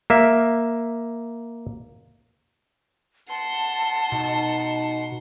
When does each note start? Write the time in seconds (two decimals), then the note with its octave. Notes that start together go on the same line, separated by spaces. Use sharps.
0.10 A#3 E5
3.29 F#5 A5 C6
4.12 B2 D#4